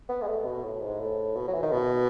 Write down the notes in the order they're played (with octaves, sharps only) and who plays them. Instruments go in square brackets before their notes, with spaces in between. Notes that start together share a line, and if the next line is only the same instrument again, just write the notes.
[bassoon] B3
G#3
A3
B2
A2
G#2
A2
B2
F#3
E3
D#3
B2